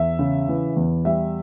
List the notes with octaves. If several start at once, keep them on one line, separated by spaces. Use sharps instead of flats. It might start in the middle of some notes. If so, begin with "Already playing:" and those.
Already playing: E2 E5
C#3
E3
E2
G3 E5